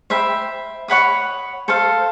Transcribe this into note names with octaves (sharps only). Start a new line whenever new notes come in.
C5 E5 G5 B5
C#5 F#5 B5 D#6
A4 C5 F5